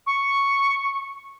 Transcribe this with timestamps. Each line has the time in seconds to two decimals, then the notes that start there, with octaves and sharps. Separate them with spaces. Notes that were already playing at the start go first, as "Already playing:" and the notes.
0.07 C#6